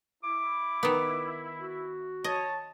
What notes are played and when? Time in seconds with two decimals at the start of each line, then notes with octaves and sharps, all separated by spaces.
0.24 E4 D6
0.83 D#3 B3
1.60 F#4
2.24 C#5 D#5 A5